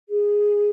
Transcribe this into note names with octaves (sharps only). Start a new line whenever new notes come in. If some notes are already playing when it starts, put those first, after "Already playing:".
G#4